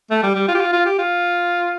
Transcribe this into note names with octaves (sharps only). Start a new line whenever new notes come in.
A3
G3
G3
F4
G4
F4
F4
G4
F4